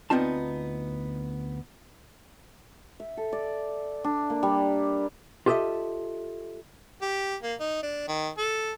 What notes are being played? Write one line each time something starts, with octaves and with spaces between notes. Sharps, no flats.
D2 B3 C4 D#4 F4 A5
E5
A4
D5
D4
A#3
G3
F4 G4 A4 C#5 D#5 E5
G4
A#3
D#4
D4
D#3
A4